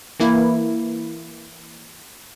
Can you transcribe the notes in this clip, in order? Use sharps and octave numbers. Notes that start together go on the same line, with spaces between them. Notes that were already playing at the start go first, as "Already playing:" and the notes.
E3 A#3 E4